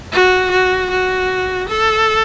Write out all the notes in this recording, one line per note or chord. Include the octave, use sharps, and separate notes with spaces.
F#4
F#4
F#4
A4